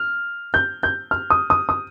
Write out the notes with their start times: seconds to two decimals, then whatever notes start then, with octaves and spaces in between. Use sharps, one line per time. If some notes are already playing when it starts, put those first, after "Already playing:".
Already playing: F6
0.54 G6
0.83 G6
1.11 F6
1.30 D#6
1.50 D#6
1.69 D#6